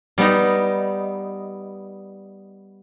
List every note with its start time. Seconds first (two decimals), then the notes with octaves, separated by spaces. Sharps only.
0.18 G3 B3 D#4